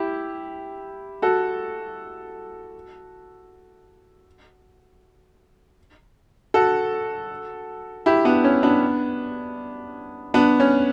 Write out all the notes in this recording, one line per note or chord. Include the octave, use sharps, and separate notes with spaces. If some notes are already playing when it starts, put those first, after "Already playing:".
Already playing: E4 G4
F#4 A4
F#4 A4
E4 G4
B3 D4
C#4
B3 D4
B3 D4
C#4